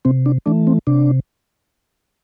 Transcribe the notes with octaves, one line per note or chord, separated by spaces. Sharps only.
C3 C4
D4
E3 A3 D4
C4
C3 D4